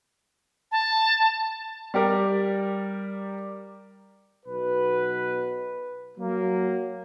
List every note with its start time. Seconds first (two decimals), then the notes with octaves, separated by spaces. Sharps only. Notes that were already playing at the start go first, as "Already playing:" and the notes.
0.71 A5
1.94 G3 G4 A#4 D5
4.46 B1 B2 B4
6.18 F#3 A#3